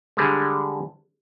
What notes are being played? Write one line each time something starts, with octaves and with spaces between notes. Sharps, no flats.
D3 G3 G#3